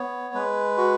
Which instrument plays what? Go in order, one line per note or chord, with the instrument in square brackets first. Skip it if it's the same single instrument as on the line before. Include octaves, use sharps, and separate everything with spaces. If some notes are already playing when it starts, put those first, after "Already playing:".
Already playing: [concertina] B3 C#5
G#3 B4
F#4